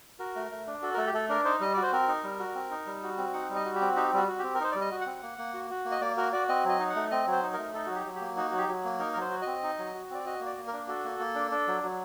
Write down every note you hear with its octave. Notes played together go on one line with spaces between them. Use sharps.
F#4 A#4
A3
A3
D4
F#4 A4
A#4
A3 A4
G4
A3 A4
D4 A#4
D#4 C5
G3 D#5
F#4 D5
C5
C4 A#4
D#4
G3
F#4
C4
D#4
G3
F#4
C4
D#4 F#5
G3
D#5
F#4
G4
C4
D#4 G4
G3 F#4
F#4
C4 G4
A#4
D#4 C5
G3 D5
D#5
F#4
F#5
C4
A#3
A#3
F#4
F#4
A#3
D#5
A#3 D5
F#4 A#4
F#4 D5
C4 D#5
F#3 D#5
D#4
F#5
A3
C4 D#5
F#3
C5
D#4
A3 A#4
D#4 A4
F#3 F#4
G4
F#3
G4
A#3
D#4 F#4
F#3 F#4
G4
F#3
A#3
D#4 A#4
A#4
F#3
C5
F#4
C4 D#5
D#4
F#3
F#4
C4 D5
F#4 D#5
A#3
D5
A#3
A#4
D4
F#4 A4
A#3
A#3
D4
D4
F#3
F#3